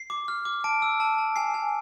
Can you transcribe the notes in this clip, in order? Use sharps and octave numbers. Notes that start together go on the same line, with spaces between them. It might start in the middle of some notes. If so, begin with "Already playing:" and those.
Already playing: C7
D6
F6
D6
A5 D7
E6
A5
A5
G#5 C7
G#5